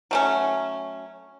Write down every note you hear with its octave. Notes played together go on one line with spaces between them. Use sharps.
F#3 A3 C#4